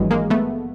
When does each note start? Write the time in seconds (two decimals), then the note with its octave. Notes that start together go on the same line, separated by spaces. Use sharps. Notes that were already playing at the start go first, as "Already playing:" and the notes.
Already playing: G#1 G2 E3 F#3 G#3
0.11 G#3 A#3
0.30 A3 B3